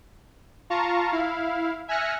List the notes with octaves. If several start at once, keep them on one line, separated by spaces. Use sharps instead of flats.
F4 F5 A5 A#5 C#6
E4 F5
E5 G#5 F6 F#6 A#6 C#7